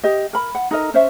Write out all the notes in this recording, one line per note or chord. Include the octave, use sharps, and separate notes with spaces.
G4 D#5
A#4 B5
F#5
D#4 A4 A#4 D#5
C#4 C5 E5